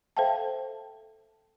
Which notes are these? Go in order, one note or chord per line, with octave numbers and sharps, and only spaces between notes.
A4 C5 E5 F5 G5 A5